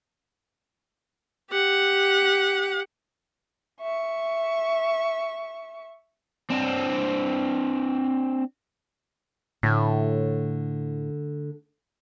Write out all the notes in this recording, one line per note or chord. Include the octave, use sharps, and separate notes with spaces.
G4 F#5
E5 C#6
C4 D4
A2 D3 A3